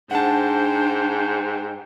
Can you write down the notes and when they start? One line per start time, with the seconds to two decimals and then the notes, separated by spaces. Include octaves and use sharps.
0.11 G#2 D4 C5 F#5 G5 A5